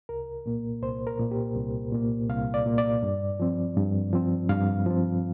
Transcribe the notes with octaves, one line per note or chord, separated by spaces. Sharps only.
C2 A#4
A#2 A#3
C2 C5
A#4
A#2 A#3
G4
C2
A#2 A#3
C2 F5
D5
A#2 A#3
D5
G2
F3 C4
G2
F3 C4
G2 F5
F3 C4